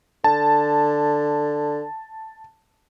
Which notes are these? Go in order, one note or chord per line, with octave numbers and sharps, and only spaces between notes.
D3 A5